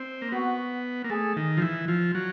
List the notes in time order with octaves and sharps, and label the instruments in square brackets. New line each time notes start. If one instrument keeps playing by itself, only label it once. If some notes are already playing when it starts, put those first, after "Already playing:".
Already playing: [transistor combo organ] C4
A#3
[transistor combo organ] B3 [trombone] F#4
[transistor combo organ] A#3
[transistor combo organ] A3 [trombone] G#4
[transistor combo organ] D#3
F3
E3
F3
F#3